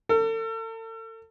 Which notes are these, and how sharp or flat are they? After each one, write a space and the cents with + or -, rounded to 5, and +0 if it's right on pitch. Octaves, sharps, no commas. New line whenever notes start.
A4 +40